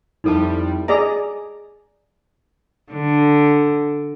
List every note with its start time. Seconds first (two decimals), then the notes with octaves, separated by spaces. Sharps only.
0.24 F2 G3 D#4 E4 A4 A5
0.88 G#4 D5 D#5 A#5
2.92 D3